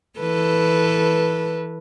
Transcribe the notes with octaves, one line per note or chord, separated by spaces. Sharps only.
E3 A4 B4